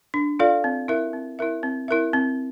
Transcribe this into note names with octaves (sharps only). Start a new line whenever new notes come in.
D4
F4 A4 D5 F5
C4
E4 A#4 E5
C4
E4 A#4 E5
C4
E4 A#4 E5
C4